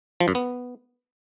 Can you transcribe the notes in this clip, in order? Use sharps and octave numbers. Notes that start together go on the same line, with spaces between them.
F3
F#2
B3